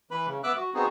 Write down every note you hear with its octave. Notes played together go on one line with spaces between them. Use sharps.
E3 B4 B5
C#3
B3 E5 D6 E6 F#6
F#4
B3 C4 D#4 F#4 G#4